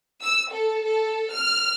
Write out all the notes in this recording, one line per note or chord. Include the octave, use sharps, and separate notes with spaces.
E6
A4
A4
F6